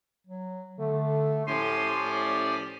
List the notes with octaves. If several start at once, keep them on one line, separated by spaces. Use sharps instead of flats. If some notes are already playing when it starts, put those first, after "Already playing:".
F#3
D3 A3
A2 F3 C#4 G4 G#5 C6
A2 D5